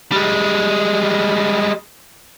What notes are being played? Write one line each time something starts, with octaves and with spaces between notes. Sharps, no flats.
G3 G#3